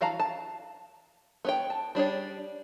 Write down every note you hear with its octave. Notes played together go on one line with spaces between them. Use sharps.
E3 F#4 F5 A5 A#5
A5
B3 C#5 G5
A5
G3 D4 G#4 C#5